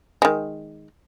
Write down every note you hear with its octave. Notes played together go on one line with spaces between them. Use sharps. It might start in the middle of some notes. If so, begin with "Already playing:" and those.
D#3 G#3